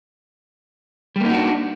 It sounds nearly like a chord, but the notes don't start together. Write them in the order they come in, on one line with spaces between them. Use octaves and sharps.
G3 A#3 D#4 F#4 D4